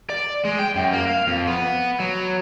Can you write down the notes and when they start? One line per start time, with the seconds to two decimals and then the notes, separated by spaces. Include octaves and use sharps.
0.10 D5
0.45 G#3
0.59 G5
0.76 F#2
0.93 A#3
1.07 F5
1.27 F2
1.47 B3
2.00 F#3